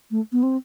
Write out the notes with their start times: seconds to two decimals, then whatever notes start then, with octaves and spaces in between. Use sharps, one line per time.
0.11 A3
0.32 B3
0.43 C4